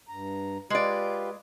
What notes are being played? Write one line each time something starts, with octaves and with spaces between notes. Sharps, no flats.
G2 A#5
G#3 F4 G4 B4 D5